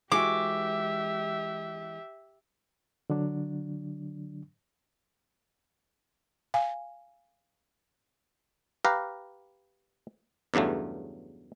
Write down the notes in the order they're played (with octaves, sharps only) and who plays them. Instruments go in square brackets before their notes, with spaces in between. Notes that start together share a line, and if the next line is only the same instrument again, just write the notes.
[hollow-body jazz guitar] E3 G#3 F#4 [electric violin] G4 E5 [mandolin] D6
[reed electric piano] D3 F#3 D4
[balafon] F5 G#5
[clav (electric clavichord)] G4 B4 F5 A#5
E2 G2 C#3 F#3 A3